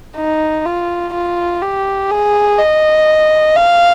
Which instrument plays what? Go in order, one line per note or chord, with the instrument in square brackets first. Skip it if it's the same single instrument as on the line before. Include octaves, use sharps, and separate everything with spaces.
[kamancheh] D#4
F4
F4
G4
G#4
D#5
F5